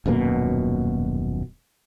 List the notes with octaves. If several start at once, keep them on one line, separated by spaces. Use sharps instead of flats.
D#1 F#2 B2 A#3